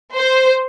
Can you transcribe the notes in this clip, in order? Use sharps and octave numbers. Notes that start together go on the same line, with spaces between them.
C5